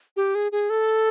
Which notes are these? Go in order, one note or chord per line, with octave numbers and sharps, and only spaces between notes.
G4
G#4
G#4
A4